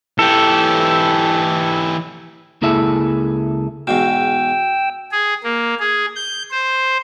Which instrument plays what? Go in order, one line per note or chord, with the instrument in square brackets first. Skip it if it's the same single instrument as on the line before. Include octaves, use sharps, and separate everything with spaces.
[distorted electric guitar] E3 G4 [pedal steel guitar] A4
[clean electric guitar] C#2 A#3 E4 G#4 A4 E5
[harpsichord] E2 G#2 B2 [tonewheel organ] G5 E6
[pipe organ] G#4
A#3
G#4
G6
C5